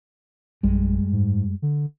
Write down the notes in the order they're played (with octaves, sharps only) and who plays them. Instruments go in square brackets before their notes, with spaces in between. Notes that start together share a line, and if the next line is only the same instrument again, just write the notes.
[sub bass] A#1 [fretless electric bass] F#2 G3 G#3
[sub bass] G#2
D3